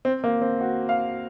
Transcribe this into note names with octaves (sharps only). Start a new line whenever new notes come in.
C4
A#3
C4
F#4
F5